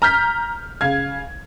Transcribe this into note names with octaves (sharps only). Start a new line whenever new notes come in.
A#5 F6 G6 B6
C#3 F5 G#6